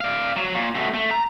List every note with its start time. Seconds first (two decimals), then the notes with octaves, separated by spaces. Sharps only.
0.01 D5 F5
0.36 F#3
0.55 A#2
0.75 B2 A3
0.94 A3
1.11 A#5